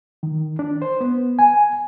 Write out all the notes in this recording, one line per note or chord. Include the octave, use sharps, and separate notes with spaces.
D#3
D4
C5
B3
G#5